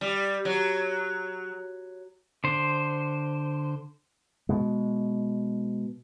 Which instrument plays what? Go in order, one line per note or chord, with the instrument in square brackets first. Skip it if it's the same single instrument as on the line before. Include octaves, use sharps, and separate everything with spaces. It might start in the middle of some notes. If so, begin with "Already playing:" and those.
[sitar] G3
F#3
[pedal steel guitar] D3 C5
[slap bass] B2 G#3